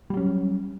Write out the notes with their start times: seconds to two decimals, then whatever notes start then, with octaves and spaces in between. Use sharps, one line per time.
0.10 G3
0.14 F#3
0.17 C#4